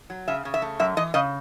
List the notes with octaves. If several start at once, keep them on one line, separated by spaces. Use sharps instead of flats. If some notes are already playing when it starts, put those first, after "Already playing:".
F#3
C#3 E5
C#3
E5
A3
F#2 E5
E3 D#5
C#3 D#5